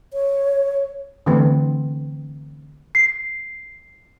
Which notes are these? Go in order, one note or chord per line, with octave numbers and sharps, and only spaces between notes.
C#5
D3 E3 A3 B3 C4
C7